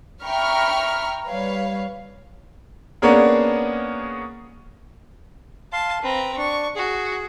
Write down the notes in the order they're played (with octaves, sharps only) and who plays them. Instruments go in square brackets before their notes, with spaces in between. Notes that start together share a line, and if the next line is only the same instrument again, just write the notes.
[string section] E5 G5 A#5 B5 C#6 F6
G3 B4 C#5 F5
[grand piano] A#3 B3 C#4 D4 G#4 A#4
[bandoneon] F5 C6 [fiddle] A5
[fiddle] C4 A#5 [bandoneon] B4
[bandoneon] D4 [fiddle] C#6
[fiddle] F#4 [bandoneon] G#4